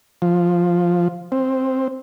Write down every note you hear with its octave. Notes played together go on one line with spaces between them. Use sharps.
F3
C4